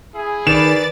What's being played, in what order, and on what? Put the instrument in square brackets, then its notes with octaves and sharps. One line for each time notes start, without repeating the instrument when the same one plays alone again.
[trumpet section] E4 G#4
[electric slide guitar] D#3 [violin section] B4 D5 A6 [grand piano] E7